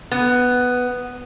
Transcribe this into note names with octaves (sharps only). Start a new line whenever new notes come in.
B3